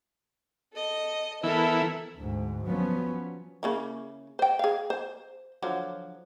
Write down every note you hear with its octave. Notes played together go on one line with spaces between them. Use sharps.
A4 D#5
E3 B3 E4 A4 A#4
D2 G#2
F3 F#3 B3 C#4
C#3 A#3 E4
C5 G5
G#4 F5
C5
D3 F3 F#3